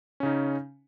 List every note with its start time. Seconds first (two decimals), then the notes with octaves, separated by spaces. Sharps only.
0.20 C#4
0.23 C#3
0.26 D#4